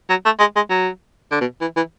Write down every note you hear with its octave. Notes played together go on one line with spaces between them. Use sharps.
F#3
A3
G#3
G#3
F#3
D3
B2
E3
E3